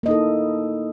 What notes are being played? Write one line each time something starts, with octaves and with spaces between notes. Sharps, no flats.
A#3 D#4 E4 A4 D#5